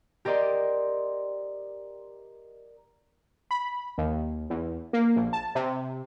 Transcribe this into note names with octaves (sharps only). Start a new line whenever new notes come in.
G4 A#4 C5 D5 D#5 C6
B5
D#2
E2
A#3
A#1
A5
C3